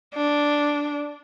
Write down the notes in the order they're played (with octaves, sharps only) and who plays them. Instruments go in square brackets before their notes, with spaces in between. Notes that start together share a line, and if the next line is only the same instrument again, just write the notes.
[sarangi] D4